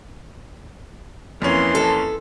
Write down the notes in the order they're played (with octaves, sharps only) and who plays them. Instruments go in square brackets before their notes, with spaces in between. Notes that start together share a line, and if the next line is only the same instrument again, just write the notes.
[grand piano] F2 A#3 C#4 [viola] E3 C6
[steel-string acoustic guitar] A4